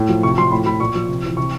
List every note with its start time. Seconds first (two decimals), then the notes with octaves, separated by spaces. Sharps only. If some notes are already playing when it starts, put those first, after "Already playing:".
Already playing: A2
0.09 F3
0.23 C3 C#6
0.38 F3 C6
0.51 A2 B5
0.66 F3 B5
0.80 A#2 C#6
0.95 F3
1.09 C3
1.24 E3
1.37 C3 C#6